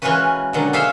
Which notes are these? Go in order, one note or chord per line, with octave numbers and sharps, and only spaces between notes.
E3 G#3 C#4 F4 F#4 B4
B2 D3 D#3 F#3
F4 G#4 C5 C#5 E5 F5